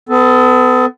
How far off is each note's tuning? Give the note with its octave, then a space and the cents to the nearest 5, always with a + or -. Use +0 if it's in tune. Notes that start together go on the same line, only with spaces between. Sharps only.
B3 +35 A4 +0